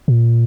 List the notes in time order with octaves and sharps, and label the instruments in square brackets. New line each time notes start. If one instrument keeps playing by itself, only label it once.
[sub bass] A#2